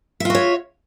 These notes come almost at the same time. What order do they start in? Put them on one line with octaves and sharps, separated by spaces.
E5 F4 F#4 C#5